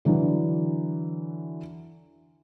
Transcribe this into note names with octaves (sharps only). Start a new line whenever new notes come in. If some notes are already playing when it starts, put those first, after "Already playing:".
D3 E3 F#3